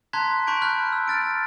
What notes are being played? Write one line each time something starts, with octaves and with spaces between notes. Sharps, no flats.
A5 A#5 C6 F#6 G#6 B6
A5 B5 C#6 G6 D7
B5 F6 F#6 G#6
E6
F6 A6 D7